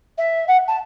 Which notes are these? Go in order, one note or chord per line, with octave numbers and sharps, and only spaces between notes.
E5
F#5
A5